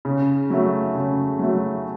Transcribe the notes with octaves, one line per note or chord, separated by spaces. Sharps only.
C#3
F#3 A3
C#3
F#3 A3